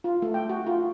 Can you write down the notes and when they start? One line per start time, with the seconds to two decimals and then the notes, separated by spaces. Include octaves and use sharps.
0.04 F4
0.22 A3
0.34 G5
0.49 F#4
0.67 F4